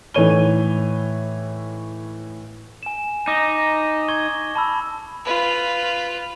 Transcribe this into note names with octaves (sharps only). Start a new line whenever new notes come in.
A2 E3 D#4 C#5 D#7 G7
G#5 E7
D#4 D6 D#6 A#6
C#6 G#6 G7
A5 B5 E6
F4 B4